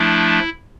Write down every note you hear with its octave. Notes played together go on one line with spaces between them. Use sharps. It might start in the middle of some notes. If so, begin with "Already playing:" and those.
Already playing: F3 A3 D4 E4